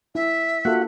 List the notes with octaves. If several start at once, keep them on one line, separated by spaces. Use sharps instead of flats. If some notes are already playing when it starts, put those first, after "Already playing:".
E4 E5
A#3 F4 F#4 A4 F#5